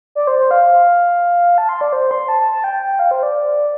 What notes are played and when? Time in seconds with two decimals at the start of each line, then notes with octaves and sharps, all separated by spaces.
0.15 D5
0.27 C5
0.39 C5
0.51 F5
1.58 A5
1.69 C6
1.81 D5
1.93 C5
2.11 C6
2.28 A5
2.40 A5
2.52 A5
2.64 G5
2.99 F5
3.11 C5
3.23 D5